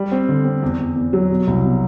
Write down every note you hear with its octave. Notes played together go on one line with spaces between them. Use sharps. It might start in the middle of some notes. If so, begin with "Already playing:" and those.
Already playing: G3
C4
D3
C4
E2
E2
E2
F#3
B2
C2
B2